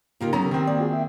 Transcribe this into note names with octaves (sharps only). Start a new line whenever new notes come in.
C#3 A#3 D#4 F4 G4 A#4
D3 F#3 B3 C#4 A#5
D#3 C4 G4 A#5
A#3 D5
F4 F#4 G#4
E5 G5